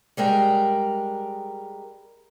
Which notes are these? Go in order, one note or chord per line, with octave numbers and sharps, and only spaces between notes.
G3 G#3 A#4 G5